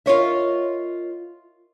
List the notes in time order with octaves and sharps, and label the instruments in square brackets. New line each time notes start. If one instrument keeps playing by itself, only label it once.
[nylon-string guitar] F4 F#4 A#4 C#5 D#5 E5